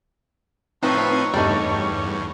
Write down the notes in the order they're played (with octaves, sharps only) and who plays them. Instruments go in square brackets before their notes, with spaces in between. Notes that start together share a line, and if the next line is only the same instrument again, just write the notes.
[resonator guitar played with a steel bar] A2 F3 [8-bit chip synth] C4 D#4 B4 [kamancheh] C#5
[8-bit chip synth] E2 G2 [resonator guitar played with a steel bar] G3 A3 D#4